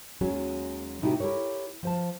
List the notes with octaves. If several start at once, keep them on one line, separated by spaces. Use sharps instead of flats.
D#2 F#3 G#3 C#4 F#4
A2 C3 D#4 E4 F#4 G4
E4 G4 A4 A#4 C#5
F3 C5 A5